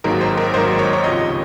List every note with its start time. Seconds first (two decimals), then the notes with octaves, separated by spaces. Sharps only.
0.04 G#1 G#2 D#3 F#3 A#3 A#4
0.21 C5
0.37 A#4
0.54 G#1 G#2 D#3 F#3 A#3 C5
0.79 C#5
0.93 C#5
1.04 C#2 C3 F3 D#5